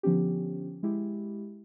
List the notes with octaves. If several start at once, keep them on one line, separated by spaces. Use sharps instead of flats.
D3 F3 B3 C#4 G4
G#3 E4 G4